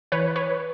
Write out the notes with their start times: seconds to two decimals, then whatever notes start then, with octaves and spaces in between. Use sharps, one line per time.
0.12 E3 B4 C#5
0.36 B4 C#5